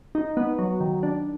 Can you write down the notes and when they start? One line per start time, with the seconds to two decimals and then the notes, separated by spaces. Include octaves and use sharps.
0.15 D#4
0.37 B3
0.59 F#3
0.80 D#3
1.03 D4